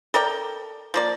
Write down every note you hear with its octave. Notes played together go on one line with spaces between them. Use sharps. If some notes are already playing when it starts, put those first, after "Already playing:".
A4 A#4 D5 G5
F3 A#3 D5